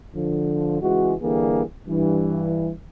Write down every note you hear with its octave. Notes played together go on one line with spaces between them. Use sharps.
D3 F3
C#2 E3 G#3 F#4
D3 E3 G3 A#3 G#4
G2 E3